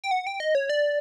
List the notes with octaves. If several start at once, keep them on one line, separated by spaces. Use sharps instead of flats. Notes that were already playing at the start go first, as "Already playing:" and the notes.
G5
F#5
G5
D#5
C#5
D5